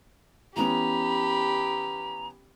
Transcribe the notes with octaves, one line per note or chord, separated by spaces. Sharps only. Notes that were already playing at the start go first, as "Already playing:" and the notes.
E3 B3 C#4 G4 A#5 B5